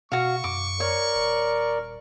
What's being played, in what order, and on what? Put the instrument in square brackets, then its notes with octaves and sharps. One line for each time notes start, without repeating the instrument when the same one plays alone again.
[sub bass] B2 [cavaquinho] F#4 F5 [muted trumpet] C#6
[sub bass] F#2 [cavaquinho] D6
[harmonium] A#4 D5 [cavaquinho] C#5
[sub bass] D#1